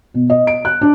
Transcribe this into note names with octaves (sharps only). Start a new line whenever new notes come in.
B2
D#5
D7
F#6
D4